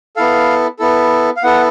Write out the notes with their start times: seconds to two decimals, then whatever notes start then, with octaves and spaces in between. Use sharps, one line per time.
0.16 B3 E4 A4 F5
0.79 B3 E4 A4
1.36 F5
1.43 B3 E4 A4 F#5